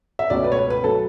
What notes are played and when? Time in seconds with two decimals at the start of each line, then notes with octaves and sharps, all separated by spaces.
0.19 E5
0.30 C#2 B2 A3 C#4 D5
0.44 B4
0.52 C#5
0.57 B4
0.70 B4
0.83 F#3 A3 A4